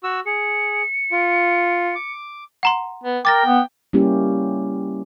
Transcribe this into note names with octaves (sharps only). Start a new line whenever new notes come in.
F#4 E6
G#4 C#7
F4
D6
F#5 A#5 C6
B3
A#4 G5 D6 A6 A#6
B3
G3 A#3 C#4 E4 G4